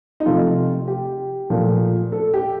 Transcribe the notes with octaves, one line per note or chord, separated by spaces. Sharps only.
D#4
C3 F3 A3 F4
G4
A#2 F3 A3
A4
G4